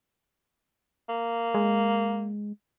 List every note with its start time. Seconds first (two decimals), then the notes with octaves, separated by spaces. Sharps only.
1.09 A#3
1.54 G#3